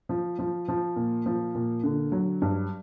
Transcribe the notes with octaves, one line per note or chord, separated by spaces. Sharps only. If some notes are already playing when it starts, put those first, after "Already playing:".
F3
F3
F3
A#2
F3
A#2
D3
F#3
G2